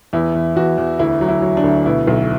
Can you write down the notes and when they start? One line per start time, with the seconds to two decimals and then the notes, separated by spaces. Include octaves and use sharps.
0.13 E2 E4
0.35 E2
0.56 E2 F#4
0.78 E2
0.99 D2 E4
1.21 F#3
1.28 E4
1.42 F#3
1.57 D4
1.64 D2
1.86 B2 E4
2.07 B1